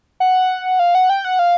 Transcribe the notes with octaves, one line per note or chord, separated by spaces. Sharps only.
F#5
F5
F#5
G5
F#5
F5